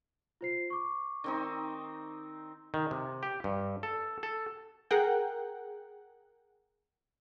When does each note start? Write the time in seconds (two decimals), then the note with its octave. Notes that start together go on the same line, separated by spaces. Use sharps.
0.41 F4 C5 C7
0.70 C#6 D6
1.24 D#3 C4 D#4
2.74 D#3
2.91 C3
3.23 G4
3.44 G2
3.83 A4
4.23 A4
4.91 G#4 A#4 F#5 G5